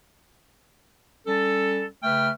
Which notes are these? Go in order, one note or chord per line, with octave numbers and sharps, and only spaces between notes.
G3 C#4 A4
C#3 A3 B4 G5 F6